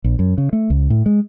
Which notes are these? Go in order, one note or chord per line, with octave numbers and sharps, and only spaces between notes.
A#1
F#2
C#3
A3
C#2
A2
G#3